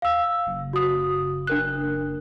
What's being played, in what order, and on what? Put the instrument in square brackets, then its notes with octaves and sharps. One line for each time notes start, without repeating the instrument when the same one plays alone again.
[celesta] F5 E6
[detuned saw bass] F#1
[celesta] F#4 D#6
D4 A#4 F#6